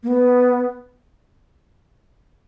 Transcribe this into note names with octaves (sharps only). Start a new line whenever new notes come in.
A#3
B3